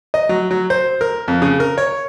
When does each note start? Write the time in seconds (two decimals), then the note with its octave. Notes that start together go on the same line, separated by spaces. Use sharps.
0.14 D#5
0.29 F#3
0.51 F#3
0.70 C5
1.01 A#4
1.28 F2
1.42 C#3
1.60 A#4
1.78 C#5